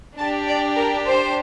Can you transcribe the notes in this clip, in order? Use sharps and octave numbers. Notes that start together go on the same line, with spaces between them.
D4 G4 A5
D5
A#4
C5